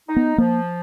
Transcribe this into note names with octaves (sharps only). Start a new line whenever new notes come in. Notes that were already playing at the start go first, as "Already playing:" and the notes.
D#4
B3
F3 A#3